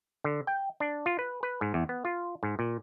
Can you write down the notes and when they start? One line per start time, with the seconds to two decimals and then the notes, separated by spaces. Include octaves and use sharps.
0.24 D3
0.47 G5
0.80 D4
1.06 F4
1.19 B4
1.43 B4
1.61 G#2
1.74 E2
1.89 B3
2.05 F4
2.43 G#2
2.59 A#2